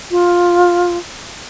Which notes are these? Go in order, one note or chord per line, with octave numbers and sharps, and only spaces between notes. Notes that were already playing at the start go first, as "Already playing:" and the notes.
F4